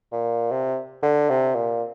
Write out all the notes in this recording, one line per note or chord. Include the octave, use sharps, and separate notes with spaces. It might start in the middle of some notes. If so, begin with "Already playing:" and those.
A#2
C3
D3
C3
A#2